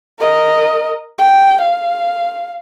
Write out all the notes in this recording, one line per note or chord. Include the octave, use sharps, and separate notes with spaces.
A#4 D#5
G5
F5